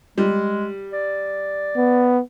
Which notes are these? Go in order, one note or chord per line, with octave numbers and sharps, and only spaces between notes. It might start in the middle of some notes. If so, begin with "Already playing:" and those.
G3 G#3
D5
B3